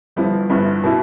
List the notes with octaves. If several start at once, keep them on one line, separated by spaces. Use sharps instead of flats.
G1 G2 F3 B3 E4
G1 G2 F3 B3 E4
B2 B3 E4